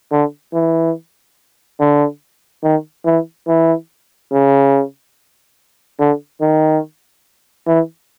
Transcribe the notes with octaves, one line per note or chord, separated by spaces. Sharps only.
D3
E3
D3
D#3
E3
E3
C#3
D3
D#3
E3